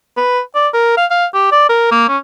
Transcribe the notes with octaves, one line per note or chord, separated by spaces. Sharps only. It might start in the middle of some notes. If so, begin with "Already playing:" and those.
B4
D5
A#4
F5
F5
G4
D5
A#4
A#3
C#4